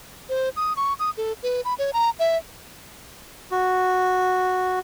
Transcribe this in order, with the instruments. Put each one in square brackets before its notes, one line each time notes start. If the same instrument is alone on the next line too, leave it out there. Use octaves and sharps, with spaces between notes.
[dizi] C5
D#6
C#6
D#6
A4
B4
B5
C#5
A#5
E5
[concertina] F#4